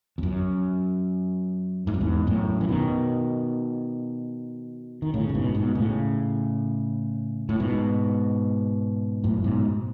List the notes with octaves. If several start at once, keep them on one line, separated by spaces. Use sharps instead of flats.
E2
F#2
G#2
F#2
E2 G#2
F#2 A2
E3
B2 D#3
D#3
A2 C#3
A2
G#2 B2
G#2 B2
A2 C#3
A2
G#2 B2
F#2 A2
G#2 B2